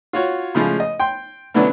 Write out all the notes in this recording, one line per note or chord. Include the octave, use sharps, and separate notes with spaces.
F4 F#4 C#5
A2 C#3 F3 G#3
D#5
G5 C6
B2 D3 E3 F#3 C#4 D4